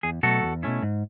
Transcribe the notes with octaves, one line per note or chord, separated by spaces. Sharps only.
E2 G#4
B2 F#3 A3 F#4 A4
E2
B2 A3 C#4 E4
G#2